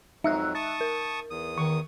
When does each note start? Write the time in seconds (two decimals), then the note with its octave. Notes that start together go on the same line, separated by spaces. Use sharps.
0.24 F2 F#3 D#4 E5 E6 F#6
0.55 A5 C#6 D#6 A6
0.81 A#4
1.30 E2 D#6
1.58 D#3 C#6